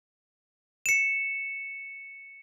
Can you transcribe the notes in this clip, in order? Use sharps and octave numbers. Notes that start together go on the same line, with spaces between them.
C#7 E7